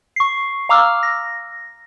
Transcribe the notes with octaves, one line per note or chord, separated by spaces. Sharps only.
C#6 C7
F5 A#5 D6 E6 F6
A#6